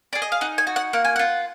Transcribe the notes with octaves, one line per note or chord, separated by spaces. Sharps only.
G#4 D5
D#5
F5
D#4 F#5
G#5
F#4
F#5
A#3 F#5
G#5
F4 F#5